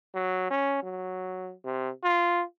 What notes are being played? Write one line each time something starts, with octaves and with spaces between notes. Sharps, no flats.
F#3
C#4
F#3
C3
F4